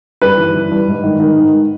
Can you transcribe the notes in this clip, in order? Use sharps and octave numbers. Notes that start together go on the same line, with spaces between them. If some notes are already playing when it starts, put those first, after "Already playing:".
G2 B4
E3
E3
G2
G#2
D#3
D#3
G#2